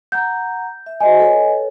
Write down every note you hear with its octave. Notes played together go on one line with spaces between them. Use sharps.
F#5 A#5 G6
E5
F#4 C5 D#5 E5 G#5
A4 B4 C#5